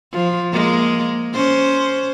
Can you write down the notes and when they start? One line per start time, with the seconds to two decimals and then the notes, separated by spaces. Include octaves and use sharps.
0.12 F3
0.52 G#3 A#3
1.34 C#4 C5